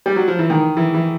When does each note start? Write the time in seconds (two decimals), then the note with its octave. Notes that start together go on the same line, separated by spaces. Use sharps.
0.06 G3
0.16 F#3
0.28 F3
0.39 E3
0.50 D#3
0.77 E3
0.94 E3